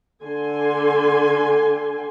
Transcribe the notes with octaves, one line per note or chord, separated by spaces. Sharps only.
D3 G#5 C6